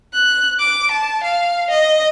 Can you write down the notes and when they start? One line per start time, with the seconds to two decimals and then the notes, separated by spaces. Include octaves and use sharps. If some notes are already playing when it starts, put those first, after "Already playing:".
0.14 F#6
0.59 D6
0.91 A5
1.23 F5
1.70 D#5